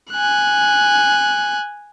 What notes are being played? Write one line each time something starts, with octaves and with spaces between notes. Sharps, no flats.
G#5 F#6